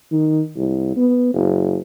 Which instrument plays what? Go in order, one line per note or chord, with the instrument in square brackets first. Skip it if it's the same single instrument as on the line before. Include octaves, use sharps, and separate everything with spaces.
[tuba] D#3
C2
B3
F#1